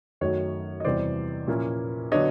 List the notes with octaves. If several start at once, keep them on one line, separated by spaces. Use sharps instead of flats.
F#2 D#3 F#3 A3 C#5
D#5
E2 C3 E3 G3 B3 C5 D5
A#2 F3 A#3 C#4 E4
D3 F#3 B3 D4 C#5 D#5